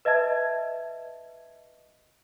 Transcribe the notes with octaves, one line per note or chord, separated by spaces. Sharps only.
B4 D#5 E5 A5 G#6